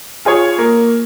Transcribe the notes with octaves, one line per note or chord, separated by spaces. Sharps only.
F4 G#4 C#5
A#3